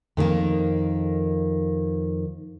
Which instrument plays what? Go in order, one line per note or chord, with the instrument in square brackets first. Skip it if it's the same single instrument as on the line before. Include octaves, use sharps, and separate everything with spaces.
[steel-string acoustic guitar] F2 D#3 G3 A#3